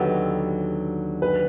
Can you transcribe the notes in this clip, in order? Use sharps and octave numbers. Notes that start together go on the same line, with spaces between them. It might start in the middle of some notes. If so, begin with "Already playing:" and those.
Already playing: D#2 D3 F#3 B3 D#4 G4
B4